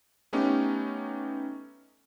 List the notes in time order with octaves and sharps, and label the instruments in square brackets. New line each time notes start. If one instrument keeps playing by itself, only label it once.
[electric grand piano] A3 B3 C#4 D#4 G4